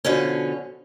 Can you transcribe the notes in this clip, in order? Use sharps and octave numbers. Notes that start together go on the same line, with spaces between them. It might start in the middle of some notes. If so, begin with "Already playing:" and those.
B2 D3 F3 C#4